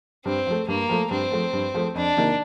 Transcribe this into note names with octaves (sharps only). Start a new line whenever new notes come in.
G2 C4
F3 A3
G2 A#3
F3 A3
G2 C4
F3 A3
G2
F3 A3
F2 D4
C3 D#3 A#3